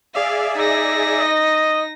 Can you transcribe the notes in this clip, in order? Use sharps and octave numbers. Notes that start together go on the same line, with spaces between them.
G#4 D5 E5 F5
D#4 A#6
D#5